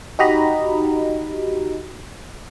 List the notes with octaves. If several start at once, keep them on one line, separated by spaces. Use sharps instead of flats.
D#4 F#4 G4 D#5 A#5 B5